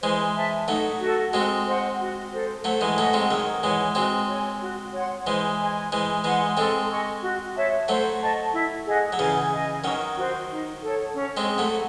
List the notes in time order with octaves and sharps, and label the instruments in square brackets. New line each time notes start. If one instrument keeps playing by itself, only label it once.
[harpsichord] E3 G#3 [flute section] C5
[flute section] E5 A5
[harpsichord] F#3 A3 [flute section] D#4
[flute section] F#4 A4
[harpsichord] G#3 C4 [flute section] F#4
[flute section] C5 D#5 F#5
F#4
A4 C5
[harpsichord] F#3 A3 [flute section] C5
[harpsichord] E3 G#3
[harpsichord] F#3 A3 [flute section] D#5 F#5 C#6
[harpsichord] G#3 C4
[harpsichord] D#3 F#3 [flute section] G#4
[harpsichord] E3 G#3 [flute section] C#5 F#5
[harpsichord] G#3 C4 [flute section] F#4
[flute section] C#5
G#5
F#4
C#5 F#5 C6
[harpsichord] E3 G#3 [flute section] C5
[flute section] D#5 G#5 C6
[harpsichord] E3 G#3 [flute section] C5
[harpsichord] E3 G#3 [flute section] F#5 C6
[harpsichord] G#3 C4 [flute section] A4
[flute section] D#5 G#5 C#6
F#4
C#5 E5 A5
[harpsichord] F#3 A3 [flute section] C5
[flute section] D#5 A5 C#6
E4
G#4 D#5 F#5
[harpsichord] F#3
[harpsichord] C#3 E3 [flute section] G#4
[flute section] D#5 G#5
[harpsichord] D#3 F#3 [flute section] C#4
[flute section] F#4 C5
D#4
A4 C#5
C#4
[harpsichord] G#3 C4
[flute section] G#4 C5
[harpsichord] F#3 A3